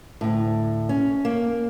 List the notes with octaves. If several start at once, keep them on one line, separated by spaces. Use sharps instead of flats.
D2 A2
C#4
A#3